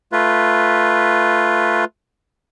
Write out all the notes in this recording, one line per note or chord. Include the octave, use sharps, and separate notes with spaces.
A3 F4 B4